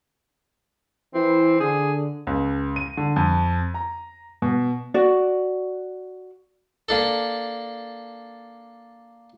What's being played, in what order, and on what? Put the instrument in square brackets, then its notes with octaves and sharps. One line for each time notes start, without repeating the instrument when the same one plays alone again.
[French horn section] E3 E4 [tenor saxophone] C4
[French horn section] D3 [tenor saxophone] G#4
[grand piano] C#2
D#7
D3
F2
A#5
B2
[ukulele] F#4 D5
[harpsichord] A#3 D4 A4